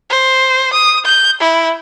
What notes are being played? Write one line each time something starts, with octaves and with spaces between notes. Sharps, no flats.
C5
D#6
G6
E4